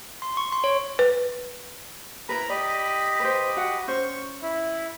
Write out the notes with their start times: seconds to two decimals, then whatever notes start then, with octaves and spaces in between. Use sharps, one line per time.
0.22 C6
0.37 C#6
0.52 C6
0.64 C#5
0.99 B4
2.29 E4 A#4 B4 A#5 B5
2.50 G4 D5 D#5 B5
3.20 B4 C5
3.57 F#4 F#5
3.88 C#4 C5 C#6
4.42 E4